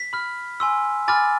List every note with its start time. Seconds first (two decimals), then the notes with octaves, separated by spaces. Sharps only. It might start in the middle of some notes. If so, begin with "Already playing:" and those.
Already playing: B6
0.13 B5 F6
0.60 G#5 C6 E6
1.08 G#5 B5 D6 F6 A6